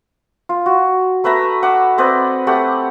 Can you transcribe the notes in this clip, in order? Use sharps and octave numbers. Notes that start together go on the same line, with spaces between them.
F4
F#4
A3 B4 E5 A#5
F#5 D6 E6
C4 B4 D5 D#5
A3 G4 F#5